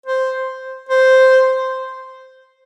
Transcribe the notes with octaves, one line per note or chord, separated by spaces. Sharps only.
C5
C5